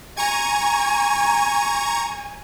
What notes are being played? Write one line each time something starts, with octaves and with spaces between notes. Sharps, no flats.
G#5 A#5 C#6 G#6